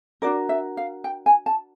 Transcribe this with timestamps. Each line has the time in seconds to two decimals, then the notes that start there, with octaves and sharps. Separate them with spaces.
0.22 D4 F#4 A#4 D5
0.49 E5
0.77 F5
1.04 G5
1.26 G#5
1.46 A5